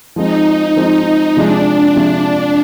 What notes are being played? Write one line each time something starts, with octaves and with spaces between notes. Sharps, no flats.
F3 G#3 C4 D#4
F3 G#3 C4
C3 F3 G#3 D4
C3 F3 G#3